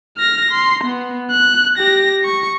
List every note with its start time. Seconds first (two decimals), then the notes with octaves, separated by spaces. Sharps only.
0.18 F6 A#6
0.51 C6
0.84 B3
1.31 F#6
1.78 G4 A#6
2.24 C#6